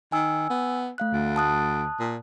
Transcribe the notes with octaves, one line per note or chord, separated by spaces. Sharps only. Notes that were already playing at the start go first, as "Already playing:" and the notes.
D#3 G#5 E6
B3
A3 F5 F#6
D2
A5 D#6 F#6
A#2